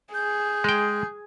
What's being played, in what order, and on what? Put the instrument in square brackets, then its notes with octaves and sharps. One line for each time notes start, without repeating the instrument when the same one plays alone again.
[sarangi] G#4 [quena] G6
[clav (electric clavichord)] G#3 G5